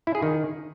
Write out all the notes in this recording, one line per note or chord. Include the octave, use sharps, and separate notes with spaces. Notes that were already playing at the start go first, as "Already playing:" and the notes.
E4
G#4
D#3